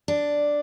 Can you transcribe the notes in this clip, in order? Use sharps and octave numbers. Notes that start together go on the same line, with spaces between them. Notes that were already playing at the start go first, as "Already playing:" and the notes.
D4